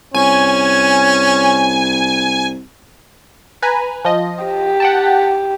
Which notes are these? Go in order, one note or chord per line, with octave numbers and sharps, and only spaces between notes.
C2 C#4 G#5
B4 G#5 A#5
F3 D#5
G4
F#5 G5 A5